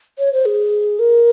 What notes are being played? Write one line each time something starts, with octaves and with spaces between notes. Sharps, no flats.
C#5
C5
G#4
A#4